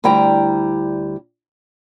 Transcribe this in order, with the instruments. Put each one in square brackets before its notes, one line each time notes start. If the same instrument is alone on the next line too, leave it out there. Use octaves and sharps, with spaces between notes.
[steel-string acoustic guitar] D2 G3 E4 G5 A#5